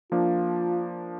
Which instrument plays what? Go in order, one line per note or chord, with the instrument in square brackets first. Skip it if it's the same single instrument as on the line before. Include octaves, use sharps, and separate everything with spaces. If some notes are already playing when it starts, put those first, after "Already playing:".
[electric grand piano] F3 A#3 D4 [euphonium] F4